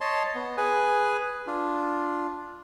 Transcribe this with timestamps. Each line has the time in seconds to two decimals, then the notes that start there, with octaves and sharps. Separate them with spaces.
0.01 C#5 D#5 A5 C6
0.35 B3
0.57 G#4 B4 G#5
1.47 D4 F4